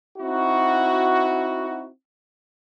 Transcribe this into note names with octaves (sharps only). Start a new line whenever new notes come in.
C4 D#4 E4 F#4